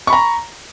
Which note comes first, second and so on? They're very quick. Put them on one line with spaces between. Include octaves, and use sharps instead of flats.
C#6 B5 A#5